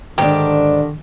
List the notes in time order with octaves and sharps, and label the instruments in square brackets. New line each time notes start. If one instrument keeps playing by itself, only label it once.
[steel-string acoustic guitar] G#2 D4 [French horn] D3 [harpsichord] D#3 [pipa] G4